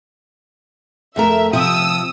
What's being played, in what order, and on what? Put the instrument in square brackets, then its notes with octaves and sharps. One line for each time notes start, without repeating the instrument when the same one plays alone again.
[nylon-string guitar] F2 A3 A#4 [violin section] E5
[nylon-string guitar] C3 F3 G4 [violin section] D#6 E6